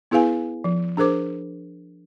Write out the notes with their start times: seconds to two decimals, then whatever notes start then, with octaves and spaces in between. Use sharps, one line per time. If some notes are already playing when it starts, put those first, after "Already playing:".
0.11 B3 E4 G#4 B4 F5 G#5
0.64 F3
0.97 D4 G#4 A#4 C5 D6